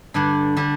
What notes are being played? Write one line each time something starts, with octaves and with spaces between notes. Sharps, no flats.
G2 D3 G3 D4
D3 G3 D4